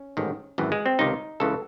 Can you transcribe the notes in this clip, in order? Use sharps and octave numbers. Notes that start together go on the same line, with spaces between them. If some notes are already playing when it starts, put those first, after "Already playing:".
Already playing: C#4
A1 G#2 D#3
G#1 F#2 E3
G#3
C4
C#2 C3 D#3 D#4
C#2 C#3 E3 A4